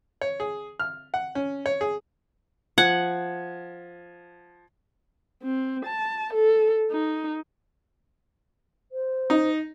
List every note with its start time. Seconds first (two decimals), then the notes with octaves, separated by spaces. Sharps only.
0.21 C#5
0.40 G#4
0.80 F6
1.14 F#5
1.35 C#4
1.66 C#5
1.81 G#4
2.78 F3 F#5 G#6
5.43 C4
5.85 A5
6.33 A4
6.91 D#4
8.91 C5
9.30 D#4